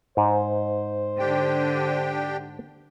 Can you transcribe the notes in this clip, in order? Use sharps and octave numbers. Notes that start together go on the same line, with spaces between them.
G#2 D#4 C5
D3 D4 G4 G5